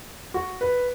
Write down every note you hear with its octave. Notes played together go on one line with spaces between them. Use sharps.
F#4
B4